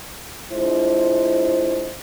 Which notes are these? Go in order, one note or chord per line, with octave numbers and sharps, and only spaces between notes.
G#3 D4 E4 F4 C5